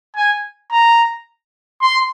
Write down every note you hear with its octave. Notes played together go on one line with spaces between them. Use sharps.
G#5
A#5
C6